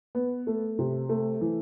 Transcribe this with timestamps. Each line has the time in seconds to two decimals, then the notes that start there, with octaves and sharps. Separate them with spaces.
0.15 B3
0.47 A3
0.79 C3
1.09 A3
1.41 E3